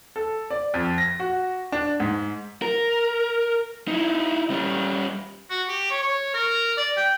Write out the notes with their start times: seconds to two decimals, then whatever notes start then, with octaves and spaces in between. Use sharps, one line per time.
0.16 A4
0.50 D5
0.74 F2
0.98 A#6
1.20 F#4
1.72 D4
2.00 G#2
2.62 A#4
3.88 D#4 E4
4.50 G3 C#4
5.50 F#4
5.69 G4
5.90 C#5
6.02 C#5
6.34 A#4
6.77 D5
6.97 G5